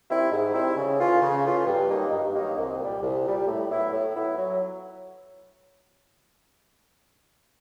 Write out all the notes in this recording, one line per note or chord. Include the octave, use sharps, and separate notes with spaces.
D#3 G3 C4 E4
G#2
D#3 G3 C4 E4
C#3
E3 A3 C#4 F4
C#3
E3 A3 C#4 F4
G2
D#3 F#3 A#3 D#4
G2
D#3 F#3 A#3 D#4
C2
A#2 G3
C2
A#2 G3
A2
F#3 B3 E4
A2
F#3 B3 E4
F#3